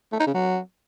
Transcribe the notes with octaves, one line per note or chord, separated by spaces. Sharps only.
A3
D#4
C#3
F#3